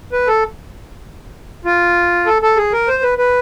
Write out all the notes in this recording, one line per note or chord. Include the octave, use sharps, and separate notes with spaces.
B4
A4
F4
A4
A4
G#4
A#4
C5
B4
B4